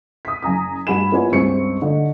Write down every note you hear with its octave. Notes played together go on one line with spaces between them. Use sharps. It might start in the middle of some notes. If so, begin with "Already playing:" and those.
D#6 B6
F#1 G#5 A#5 D#6
G2 F#4 G#5 B5 E7
A#3 B3 E4 F4 C#5 G#5
C#2 G2 C4 C#6 C#7
D3 D#4